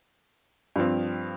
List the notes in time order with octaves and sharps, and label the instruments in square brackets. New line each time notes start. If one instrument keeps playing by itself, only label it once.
[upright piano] G2 F3 C4